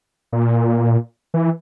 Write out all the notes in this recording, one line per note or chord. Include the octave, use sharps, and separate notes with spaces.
A#2
E3